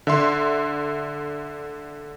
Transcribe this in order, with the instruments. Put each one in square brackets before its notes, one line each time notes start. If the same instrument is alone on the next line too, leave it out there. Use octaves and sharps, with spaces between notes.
[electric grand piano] D3 E5 C6